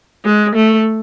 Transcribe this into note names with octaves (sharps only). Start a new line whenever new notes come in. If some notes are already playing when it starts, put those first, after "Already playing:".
G#3
A3